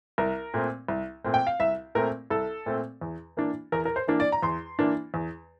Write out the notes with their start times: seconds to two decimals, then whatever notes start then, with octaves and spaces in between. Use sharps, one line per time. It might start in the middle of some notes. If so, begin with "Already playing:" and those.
0.18 C2 A#4
0.54 A#2 A3 C4
0.89 C2
1.24 A#2 A3 C4
1.34 G5
1.47 F5
1.60 C2 E5
1.95 A#2 A3 C4 A#4
2.30 C2 A4
2.66 A#2 A3 C4
3.01 E2
3.37 E3 A#3 D4
3.72 E2 A#4
3.85 A#4
3.96 C5
4.07 E3 A#3 D4
4.20 D5
4.32 A#5
4.42 E2 C6
4.79 E3 A#3 D4
5.14 E2